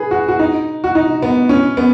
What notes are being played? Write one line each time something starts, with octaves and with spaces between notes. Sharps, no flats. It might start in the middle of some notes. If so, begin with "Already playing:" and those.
Already playing: G#4 B4
F#4
F#4
D#4
F#4
D#4
B3
C#4
B3